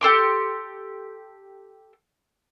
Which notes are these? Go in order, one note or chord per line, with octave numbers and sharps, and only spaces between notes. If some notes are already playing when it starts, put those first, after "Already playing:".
G4 A4 C6 D6